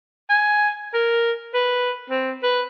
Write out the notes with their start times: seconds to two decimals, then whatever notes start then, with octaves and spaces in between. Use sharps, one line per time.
0.30 G#5
0.94 A#4
1.54 B4
2.10 C4
2.43 B4